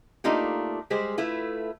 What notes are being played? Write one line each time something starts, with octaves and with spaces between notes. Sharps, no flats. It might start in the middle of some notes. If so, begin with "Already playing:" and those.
A3 A#3 D4 D#4 F4 G4
G3 G#3 G4 G#4 C5
A3 E4 F4 B4